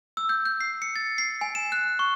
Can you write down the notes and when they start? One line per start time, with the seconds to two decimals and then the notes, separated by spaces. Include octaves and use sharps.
0.17 E6
0.29 G6
0.46 G6
0.61 C7
0.82 C#7
0.96 A6
1.18 C7
1.41 G#5
1.55 E7
1.72 F#6
1.99 C#6